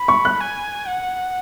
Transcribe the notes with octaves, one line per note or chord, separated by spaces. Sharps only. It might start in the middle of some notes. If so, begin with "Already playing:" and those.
Already playing: B5
C#6
F#6
G#5
F#5